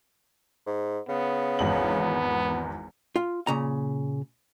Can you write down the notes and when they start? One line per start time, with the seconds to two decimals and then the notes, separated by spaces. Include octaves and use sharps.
0.67 G#2
1.09 C#3 B3
1.59 G#1 E2 F#7
3.16 F4
3.47 A#2 C#3 A#5